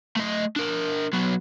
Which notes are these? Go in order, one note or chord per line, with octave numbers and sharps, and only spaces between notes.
A3 D#5
D4 A#4
F#3 B3